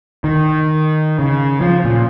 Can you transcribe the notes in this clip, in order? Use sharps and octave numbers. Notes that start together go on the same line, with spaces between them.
D#3
C#3
F3
A#2